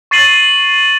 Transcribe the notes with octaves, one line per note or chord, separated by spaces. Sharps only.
C#6 A6 C7 D#7 F#7